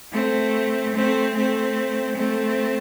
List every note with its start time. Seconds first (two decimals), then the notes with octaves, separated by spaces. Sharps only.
0.13 A3 C4
0.95 A3 C4
1.35 A3 C4
2.17 A3 C4